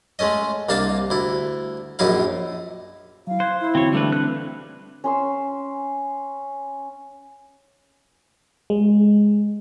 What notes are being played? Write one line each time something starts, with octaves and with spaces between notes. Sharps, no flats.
G#3 A3 C#4 D#5
C2 A#3 D4 F5 A5
D2 E4
A#1 F#2 D#4 E4 F5
F#3 E4 F5
C5 F#6 G#6
E4
D3 E3 C4 F#4 C#5
G3 A3 D4 B4
D3 C4 B4 F#6
C#4 C6 E6
G#3